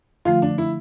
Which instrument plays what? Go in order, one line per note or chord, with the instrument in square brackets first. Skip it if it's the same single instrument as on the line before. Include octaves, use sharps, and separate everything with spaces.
[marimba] D3 F3 A3 [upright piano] F4
[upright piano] D4
E4